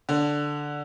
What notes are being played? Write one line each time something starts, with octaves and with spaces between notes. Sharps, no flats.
D3